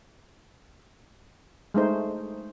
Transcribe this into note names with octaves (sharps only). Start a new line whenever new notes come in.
G#3 A3 D#4 C5